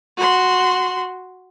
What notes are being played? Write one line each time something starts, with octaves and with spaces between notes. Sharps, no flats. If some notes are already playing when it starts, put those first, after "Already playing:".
F#4 C6